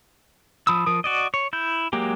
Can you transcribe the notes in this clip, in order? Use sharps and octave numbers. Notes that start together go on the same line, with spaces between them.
F3 B5 D#6 E6
F3 A#4 D#6
F#4 D5 D#5
C#5
E4 G6
F#3 G#3 A#3 G4